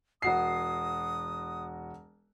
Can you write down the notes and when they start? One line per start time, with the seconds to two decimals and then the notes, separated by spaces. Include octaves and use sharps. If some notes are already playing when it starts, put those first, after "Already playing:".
0.22 E1 F#4 D#6 C7